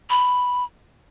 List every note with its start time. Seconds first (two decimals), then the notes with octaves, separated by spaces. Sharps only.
0.10 B5